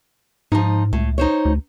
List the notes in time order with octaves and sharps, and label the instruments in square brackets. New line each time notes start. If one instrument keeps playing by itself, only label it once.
[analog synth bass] G#2 [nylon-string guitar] F3 D#4
[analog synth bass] C#2 [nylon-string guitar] A2
[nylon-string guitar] D#4 C5 C#5
[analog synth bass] D2